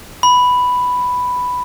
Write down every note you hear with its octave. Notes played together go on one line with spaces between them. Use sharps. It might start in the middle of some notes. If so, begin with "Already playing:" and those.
B5